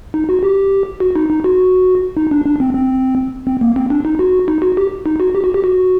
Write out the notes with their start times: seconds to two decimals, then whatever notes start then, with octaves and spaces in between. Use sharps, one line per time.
0.14 D#4
0.29 F#4
0.43 G4
1.00 F#4
1.16 D#4
1.30 D#4
1.44 F#4
2.17 D#4
2.31 D4
2.46 D4
2.60 C4
2.74 C4
3.47 C4
3.61 A#3
3.76 C4
3.90 D4
4.05 D#4
4.19 F#4
4.48 D#4
4.62 F#4
4.77 G4
5.06 D#4
5.20 F#4
5.35 G4
5.44 F#4
5.54 G4
5.64 F#4